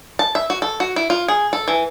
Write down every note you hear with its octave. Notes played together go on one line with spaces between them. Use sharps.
A5
E5
F#4
A4
F#4
E4
F4
G#4
A4
E3